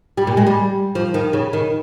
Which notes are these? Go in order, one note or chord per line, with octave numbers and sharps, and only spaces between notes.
G3
A#2
G#3
G3
F3
D#3
C#3
D#3